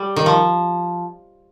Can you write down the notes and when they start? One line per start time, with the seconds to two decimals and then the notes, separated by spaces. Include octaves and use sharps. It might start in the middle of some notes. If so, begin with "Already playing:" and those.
Already playing: G3
0.16 D#3
0.26 F3